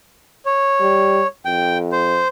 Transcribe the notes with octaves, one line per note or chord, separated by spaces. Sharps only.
C#5
G3
F2 G5
C5